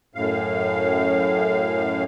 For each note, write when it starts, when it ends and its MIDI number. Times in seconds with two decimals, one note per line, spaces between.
0.15 2.04 42
0.15 2.04 45
0.15 2.04 77